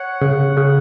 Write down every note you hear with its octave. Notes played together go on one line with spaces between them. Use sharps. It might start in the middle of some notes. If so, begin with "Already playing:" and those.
Already playing: C#5 F#5
C#3
C#3